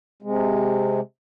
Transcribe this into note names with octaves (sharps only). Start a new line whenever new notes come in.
C3 G#3